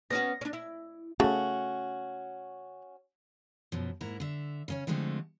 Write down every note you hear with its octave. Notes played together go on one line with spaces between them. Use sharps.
B3 C#4 F#4 A#6
C#4 D4
E4
C#3 A3 C#4 F#4
F#2 B2 F3
G#2 A#3 E4 A#5
D3 E5
C#3 C#4 C#5
D3 F3 G#3 A3 C4